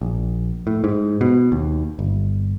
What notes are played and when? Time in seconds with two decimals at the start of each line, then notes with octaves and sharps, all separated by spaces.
0.01 A#1
0.67 A2
0.84 G#2
1.21 B2
1.52 D#2
1.99 G1